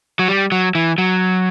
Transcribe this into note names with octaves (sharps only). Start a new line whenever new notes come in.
F#3
G3
F#3
E3
F#3